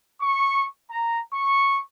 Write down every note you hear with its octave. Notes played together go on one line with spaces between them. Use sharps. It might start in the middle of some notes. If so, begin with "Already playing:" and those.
C#6
A#5
C#6